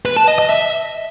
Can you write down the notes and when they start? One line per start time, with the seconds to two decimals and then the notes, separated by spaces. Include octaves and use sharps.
0.05 B4
0.17 A5
0.28 D#5
0.39 D#5
0.50 E5